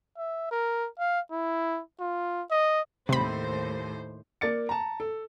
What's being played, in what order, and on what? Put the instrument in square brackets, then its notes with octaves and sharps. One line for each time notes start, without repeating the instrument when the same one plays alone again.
[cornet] E5
A#4
F5
E4
F4
D#5
[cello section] D#2 A2 C5 [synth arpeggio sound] C3 B5
[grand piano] A#3 D5 A6 C#7
A5 A#5
A4